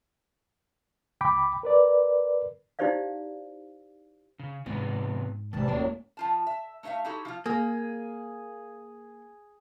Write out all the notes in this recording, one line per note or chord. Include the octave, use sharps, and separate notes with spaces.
C#2 G5 B5 D6
A#4 B4 D5
D#4 E4 G4 C5 D5 F5
C#3
G#2 C3 E3 B3
G#1 G#2 C3 D#3 E3 G3 A5
D1 F#2 A2 F#3 A#3 C#4 D5
F3 F4 A5
E5
A3 D#4 D5 E5 F5
D#4 E4 F#4 G4 A4
F3 E4 F4
A#3 G#4